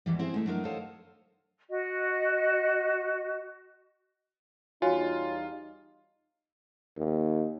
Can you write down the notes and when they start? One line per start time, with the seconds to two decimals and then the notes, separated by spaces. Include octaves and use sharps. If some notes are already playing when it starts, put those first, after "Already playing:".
0.06 E2 G#2 E3 G3
0.19 C4 E4 G#4 C5
0.34 G#3 A3 E4
0.46 F#3 D4 D#4 A#4
0.65 A4 C5 C#5 D#5 F5 A5
1.69 F#4 D#5
4.82 E2 G3 D#4 F4 F#4 C#5 G#5
6.97 D#2